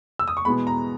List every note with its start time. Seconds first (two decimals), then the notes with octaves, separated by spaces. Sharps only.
0.19 E6
0.28 D#6
0.37 C#6
0.45 E2 B2 G#3 B3 B5
0.67 A#5